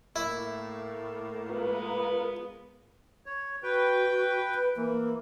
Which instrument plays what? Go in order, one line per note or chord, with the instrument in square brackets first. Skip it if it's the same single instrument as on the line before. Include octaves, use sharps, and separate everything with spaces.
[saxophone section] A2 A3 A#3 [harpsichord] E4
[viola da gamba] G#3 B3 [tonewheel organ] F4 A#4 B4
[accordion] C#5
[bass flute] F#4 [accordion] B4 G5
[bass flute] B4
[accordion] E3 [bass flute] A#3